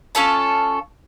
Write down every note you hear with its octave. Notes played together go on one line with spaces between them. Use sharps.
C#4 F4 A4 A5